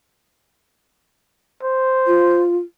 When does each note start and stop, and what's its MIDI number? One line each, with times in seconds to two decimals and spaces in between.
1.63 2.45 72
2.07 2.57 65